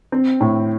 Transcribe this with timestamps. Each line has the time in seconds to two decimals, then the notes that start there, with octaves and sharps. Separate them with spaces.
0.12 C4
0.41 A2